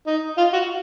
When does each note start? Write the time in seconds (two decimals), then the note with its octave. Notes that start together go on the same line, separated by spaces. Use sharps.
0.07 D#4
0.37 F4
0.53 F#4